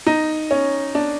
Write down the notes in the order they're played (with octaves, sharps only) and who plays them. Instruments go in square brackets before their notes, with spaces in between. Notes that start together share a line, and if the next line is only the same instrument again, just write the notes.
[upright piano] D#4
C#4
D4